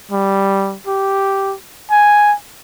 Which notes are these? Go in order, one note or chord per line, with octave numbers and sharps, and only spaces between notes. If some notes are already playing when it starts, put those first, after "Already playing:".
G3
G4
G#5